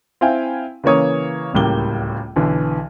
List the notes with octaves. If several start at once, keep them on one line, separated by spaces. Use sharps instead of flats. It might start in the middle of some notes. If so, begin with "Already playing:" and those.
C4 E4 F5 G5 G#5
C#3 E3 A#3 C#5 D#6
D1 C#2 A2 G3 A#3 G7
B1 D3 E3